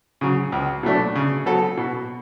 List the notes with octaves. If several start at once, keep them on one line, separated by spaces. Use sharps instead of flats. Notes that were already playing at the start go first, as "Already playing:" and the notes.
C#3 F#3
C#2
B2 F#3 A3 D4
C#3
F#3 B3 F#4 A4
B2